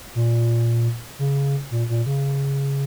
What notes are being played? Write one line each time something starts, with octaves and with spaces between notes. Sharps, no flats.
A#2
C#3
A#2
A#2
C#3